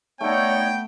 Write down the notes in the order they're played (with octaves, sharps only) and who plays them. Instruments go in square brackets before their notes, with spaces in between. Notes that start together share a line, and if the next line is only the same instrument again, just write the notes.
[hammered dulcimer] A3 [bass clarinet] B3 [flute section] D#4 C#5 D5 [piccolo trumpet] G5